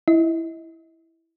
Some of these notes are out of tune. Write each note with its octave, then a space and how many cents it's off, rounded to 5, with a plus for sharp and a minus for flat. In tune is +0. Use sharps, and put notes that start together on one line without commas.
E4 +0 D#5 +35